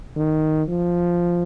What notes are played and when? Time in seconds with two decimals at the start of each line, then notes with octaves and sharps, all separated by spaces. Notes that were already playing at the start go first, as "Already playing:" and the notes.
0.17 D#3
0.69 F3